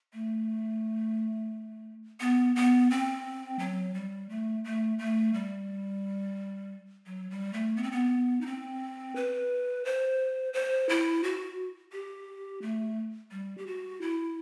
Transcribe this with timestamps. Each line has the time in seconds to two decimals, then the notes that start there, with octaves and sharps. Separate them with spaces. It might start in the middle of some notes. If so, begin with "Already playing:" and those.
0.13 A3
2.20 B3
2.56 B3
2.90 C4
3.59 F#3
3.94 G3
4.29 A3
4.64 A3
4.99 A3
5.34 G3
7.06 F#3
7.30 G3
7.53 A3
7.77 B3
7.83 C4
7.92 B3
8.41 D#4
8.46 C4
9.16 B4
9.85 C5
10.53 C5
10.89 E4
11.24 F#4
11.92 G4
12.62 A3
13.31 G3
13.58 G4
13.67 F#4
14.01 E4